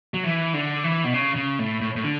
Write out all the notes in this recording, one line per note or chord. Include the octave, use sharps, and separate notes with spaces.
F#3
E3
D3
E3
B2
C#3
C#3
A2
A2
A2
D3